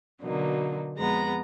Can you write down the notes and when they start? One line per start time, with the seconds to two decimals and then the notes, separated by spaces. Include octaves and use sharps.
0.22 B2 D3 F#3 A#3 D#4
0.98 F2 G#3 B3 A#5